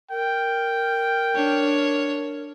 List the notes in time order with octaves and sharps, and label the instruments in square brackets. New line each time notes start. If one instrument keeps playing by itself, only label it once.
[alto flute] A#4 [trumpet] G5
[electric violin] D4 C#5